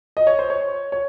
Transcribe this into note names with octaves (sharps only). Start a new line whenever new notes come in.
D#5
C#5
C5
C#5
C#5